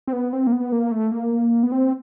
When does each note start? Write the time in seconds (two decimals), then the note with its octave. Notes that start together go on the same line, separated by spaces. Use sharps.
0.08 C4
0.13 B3
0.33 C4
0.47 A#3
0.52 B3
0.72 A#3
0.92 A3
1.12 A#3
1.63 B3
1.72 C4